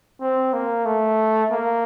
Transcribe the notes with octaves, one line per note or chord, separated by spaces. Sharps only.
C4
A#3
A3
A#3